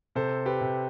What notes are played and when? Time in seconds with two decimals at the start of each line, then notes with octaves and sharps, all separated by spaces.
0.15 C3 A4 C5
0.46 G4 B4
0.61 C3